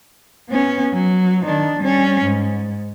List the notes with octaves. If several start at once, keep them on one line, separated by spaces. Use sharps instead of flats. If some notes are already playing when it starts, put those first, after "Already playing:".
B3 C#4
F#3
D#3 D4
G3 C#4
G#2